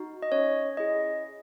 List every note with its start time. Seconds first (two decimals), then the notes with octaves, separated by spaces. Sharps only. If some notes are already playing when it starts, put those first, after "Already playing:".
Already playing: D#4 F#4
0.22 D#5
0.32 C#4 C#5
0.77 E4 G#4 D#5